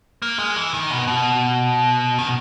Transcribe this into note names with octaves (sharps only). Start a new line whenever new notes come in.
A#3
G#3
E3
D#3
B2
B2
D#3